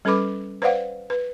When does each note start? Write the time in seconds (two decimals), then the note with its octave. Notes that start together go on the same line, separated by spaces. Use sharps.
0.05 G3 C#4 A4 B4 B5 D6
0.62 B4 C5 D5 F5 F#5
1.10 B4